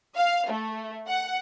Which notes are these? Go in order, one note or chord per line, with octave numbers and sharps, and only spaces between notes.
F5
A3
F#5